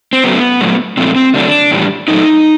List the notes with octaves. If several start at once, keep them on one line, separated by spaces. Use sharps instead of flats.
C4
C#3 F#3 A3 B3
A#2 F#3 A3
A#2 F3 A3 C4
C4
C#3 F#3 A3 D4
A2 E3 G3
A#2 F#3 A3 D#4